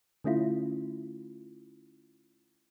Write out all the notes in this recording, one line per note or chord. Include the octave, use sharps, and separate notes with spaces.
D3 A3 C#4 E4 F4